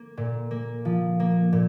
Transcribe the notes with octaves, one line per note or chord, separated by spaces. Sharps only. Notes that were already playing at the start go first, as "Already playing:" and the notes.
Already playing: A#3
A#2
A#3
F3
A#3
A#2